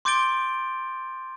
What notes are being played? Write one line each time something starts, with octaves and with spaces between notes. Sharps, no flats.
C6 D6 G6 A6 D7 G7